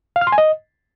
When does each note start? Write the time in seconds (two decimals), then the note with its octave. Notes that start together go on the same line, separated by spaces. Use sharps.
0.16 F5
0.21 F6
0.27 C6
0.32 G#5
0.38 D#5